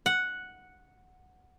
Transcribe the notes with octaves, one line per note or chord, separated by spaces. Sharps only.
F#5